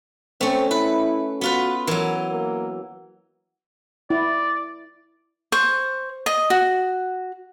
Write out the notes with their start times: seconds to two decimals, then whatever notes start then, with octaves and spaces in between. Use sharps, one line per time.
0.41 A3 C4 C#4
0.71 E4 B4
1.41 B3 F4 F#4 B4
1.87 E3 F#3 A#4
2.31 A#3
4.10 E4 D5
5.52 C5 C#6
6.26 D#5
6.50 F#4